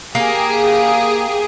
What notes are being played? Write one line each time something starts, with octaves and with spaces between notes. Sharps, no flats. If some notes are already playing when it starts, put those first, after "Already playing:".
A#3 G4 G#4